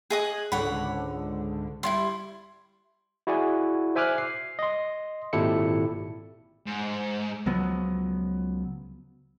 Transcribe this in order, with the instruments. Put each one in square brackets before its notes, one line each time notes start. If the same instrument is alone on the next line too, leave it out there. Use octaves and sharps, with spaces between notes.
[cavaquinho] G#4 D#5 D#6 [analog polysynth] G#5 F#6
[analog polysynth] C#2 G#2 D3 [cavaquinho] C#5 F#5 B5
[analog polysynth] G3 [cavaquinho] E4 F4 C6
[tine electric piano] E4 F#4 G#4 D5 G#5
C5 E5 G#5 D6 F6 F#6
C7
D#5 C6
G#1 A#2 E4 G4 A4 C#7
[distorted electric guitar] G#2
[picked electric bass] C#2 F3 F#3 B3